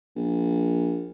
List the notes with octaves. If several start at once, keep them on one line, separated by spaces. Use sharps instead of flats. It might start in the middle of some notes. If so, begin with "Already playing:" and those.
A#1